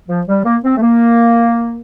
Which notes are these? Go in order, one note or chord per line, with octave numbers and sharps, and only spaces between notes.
F3
G3
A#3
C4
A3
A#3